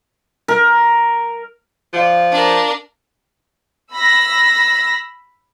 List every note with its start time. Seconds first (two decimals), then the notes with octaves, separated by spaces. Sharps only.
0.48 A#4
1.93 F3 D5 F5 F#6
2.32 D4 A#4
3.93 B5 E6 A#6